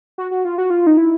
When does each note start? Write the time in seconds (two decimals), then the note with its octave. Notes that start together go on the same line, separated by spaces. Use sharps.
0.18 F#4
0.31 F#4
0.45 F4
0.58 F#4
0.70 F4
0.87 D#4
0.97 E4